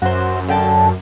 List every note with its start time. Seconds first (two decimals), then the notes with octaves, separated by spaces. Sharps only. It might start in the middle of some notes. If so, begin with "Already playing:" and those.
0.02 F#2 F#4 C5
0.49 D3 G5 A5